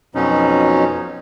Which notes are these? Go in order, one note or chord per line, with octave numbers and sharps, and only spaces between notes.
F2 B2 F#3 C#4 D#4